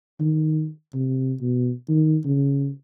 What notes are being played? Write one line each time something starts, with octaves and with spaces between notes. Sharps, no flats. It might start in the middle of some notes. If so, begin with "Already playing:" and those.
D#3
C3
B2
D#3
C#3